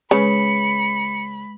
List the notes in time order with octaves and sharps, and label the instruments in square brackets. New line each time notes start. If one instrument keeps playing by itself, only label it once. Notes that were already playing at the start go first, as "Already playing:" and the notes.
[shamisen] C#3 [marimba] G#3 B4 [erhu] B5 [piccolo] C#7